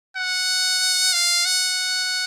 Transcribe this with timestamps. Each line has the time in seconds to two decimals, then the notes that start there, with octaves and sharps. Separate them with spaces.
0.16 F#5
1.13 F5
1.45 F#5